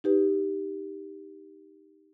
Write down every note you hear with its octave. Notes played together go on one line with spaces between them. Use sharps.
D#4 G4 B4